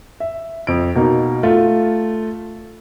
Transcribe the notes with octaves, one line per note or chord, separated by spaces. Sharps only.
E5
F2 D7
B2 A#3 D#4
A3 F4